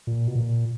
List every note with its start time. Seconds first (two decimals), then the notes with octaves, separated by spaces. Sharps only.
0.07 A#2
0.28 B2
0.35 A#2